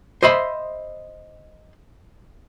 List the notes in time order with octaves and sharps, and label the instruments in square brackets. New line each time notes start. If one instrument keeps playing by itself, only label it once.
[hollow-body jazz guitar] C5 D#5 E5 B5 C6